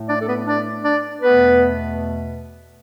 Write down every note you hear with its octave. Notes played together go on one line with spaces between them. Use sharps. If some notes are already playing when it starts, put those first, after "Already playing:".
Already playing: A2 A3
D4 D5
A4
B3 B4
D4 D5
D4 D5
E2 B2 A3 B3 B4